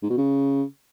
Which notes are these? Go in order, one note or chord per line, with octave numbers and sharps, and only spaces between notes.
G#2
B2
C#3